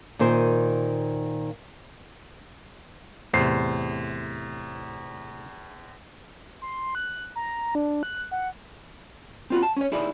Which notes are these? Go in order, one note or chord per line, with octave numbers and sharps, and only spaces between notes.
A#2 D#3 C5 G#5
E2 A2 C3 C5 C7
C6
F#6
A#5
D4
F#6
F#5
C4 F4 F#4
A5
C#4 C#5
D#4 E4 G#4 D5